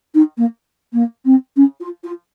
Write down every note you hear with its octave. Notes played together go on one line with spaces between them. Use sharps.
D#4
A#3
A#3
C4
C#4
F4
F4